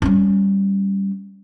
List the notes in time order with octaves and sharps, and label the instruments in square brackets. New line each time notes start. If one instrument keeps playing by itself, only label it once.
[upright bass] G3 C#4